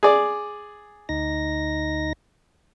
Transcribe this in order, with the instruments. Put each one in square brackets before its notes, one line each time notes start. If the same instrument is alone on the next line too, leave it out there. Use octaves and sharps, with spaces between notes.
[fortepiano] G#4 D5
[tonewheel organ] D2 D#4 A#6